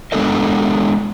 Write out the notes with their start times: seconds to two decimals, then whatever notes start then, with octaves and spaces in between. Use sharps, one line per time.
0.12 G#3 B3 D4 A4 A#4 D#5